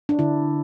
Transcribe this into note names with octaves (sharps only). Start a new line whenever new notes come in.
D4
D3 E4